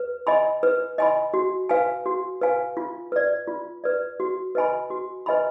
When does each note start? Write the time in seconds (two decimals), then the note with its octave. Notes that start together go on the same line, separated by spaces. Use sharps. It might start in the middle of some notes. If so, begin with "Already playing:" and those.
Already playing: B4
0.27 D#5 G#5 B5
0.63 B4
0.98 D#5 G#5 B5
1.34 F#4
1.69 B4 F5 G#5
2.06 F#4
2.41 B4 F5 G#5
2.77 F4
3.12 B4 D5
3.47 F4
3.84 B4 D5
4.20 F#4
4.55 B4 D#5 G#5 B5
4.90 F#4
5.26 B4 D#5 G#5 B5